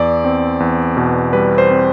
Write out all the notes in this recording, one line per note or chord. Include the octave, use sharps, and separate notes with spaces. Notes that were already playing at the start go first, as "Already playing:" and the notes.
Already playing: E2 D5
C4
E2
B2
G3 B4
C5
C4